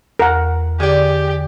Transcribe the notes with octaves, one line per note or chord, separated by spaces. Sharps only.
E2 A#4 F#5
D3 G4 G#4 D5